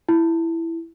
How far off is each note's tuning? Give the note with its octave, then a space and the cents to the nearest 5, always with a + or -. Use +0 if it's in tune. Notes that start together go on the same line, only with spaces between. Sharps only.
E4 +5